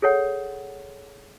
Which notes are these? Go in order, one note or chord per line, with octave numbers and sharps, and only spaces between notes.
G#4 A4 C#5 F#5